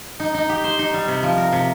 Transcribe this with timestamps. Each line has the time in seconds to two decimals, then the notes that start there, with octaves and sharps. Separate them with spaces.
0.20 D#4
0.34 D#4
0.49 G4
0.64 C5
0.79 D#4
0.94 G3
1.08 C3
1.23 F3
1.38 A#4
1.52 C3